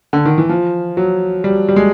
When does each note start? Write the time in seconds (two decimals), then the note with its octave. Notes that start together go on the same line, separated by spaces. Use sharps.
0.13 D3
0.25 D#3
0.38 E3
0.49 F3
0.97 F#3
1.44 G3
1.69 G3
1.76 G#3